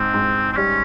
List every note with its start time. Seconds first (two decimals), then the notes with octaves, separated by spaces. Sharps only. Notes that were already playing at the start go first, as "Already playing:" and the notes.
Already playing: G#2 C4
0.14 G#2
0.52 C4
0.57 G3 C#4